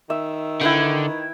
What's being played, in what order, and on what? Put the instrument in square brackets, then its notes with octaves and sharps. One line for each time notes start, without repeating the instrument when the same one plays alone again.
[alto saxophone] D#3 [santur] E5
[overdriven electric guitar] D3 [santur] E4 B4 G5